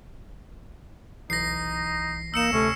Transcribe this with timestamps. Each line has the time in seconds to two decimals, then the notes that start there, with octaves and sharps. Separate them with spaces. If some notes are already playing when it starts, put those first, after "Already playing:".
1.30 B1 E3 D#4 A#6 C7
2.34 A#3 D#4 E6 C#7 E7
2.52 D2 C3 A3 C#4